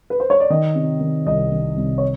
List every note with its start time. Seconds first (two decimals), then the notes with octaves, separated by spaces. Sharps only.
0.10 B4
0.20 C5
0.30 C#5
0.40 D5
0.50 D#3 D#5
0.75 C3
1.01 D#3
1.26 C2 D#5
1.52 D#3
1.76 C2
1.98 C#5